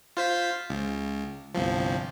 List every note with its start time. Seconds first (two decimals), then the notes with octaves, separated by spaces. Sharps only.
0.17 F4 C5 B6
0.70 C#2
1.55 G1 C2 F3